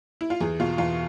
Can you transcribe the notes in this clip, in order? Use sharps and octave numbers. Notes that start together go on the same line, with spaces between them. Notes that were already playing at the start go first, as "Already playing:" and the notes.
E4
F4
E2 G#4
B2 F4
E2 F4